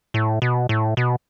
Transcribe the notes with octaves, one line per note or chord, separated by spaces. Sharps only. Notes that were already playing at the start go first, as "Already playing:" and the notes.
A2
B2
A2
B2